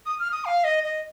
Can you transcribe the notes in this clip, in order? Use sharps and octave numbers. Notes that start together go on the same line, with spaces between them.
D#6
F6
D#6
F5
D#5
D#5